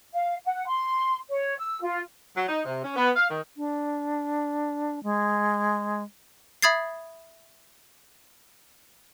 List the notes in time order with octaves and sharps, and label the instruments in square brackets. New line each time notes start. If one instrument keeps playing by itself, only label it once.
[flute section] F5
F#5
C6
C#5
E6
F4
[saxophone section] F#3
D#4
C3
C#4
B3
F5
D#3
[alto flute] D4
G#3
[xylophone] E5 B5 D#6 G#6 A6 C7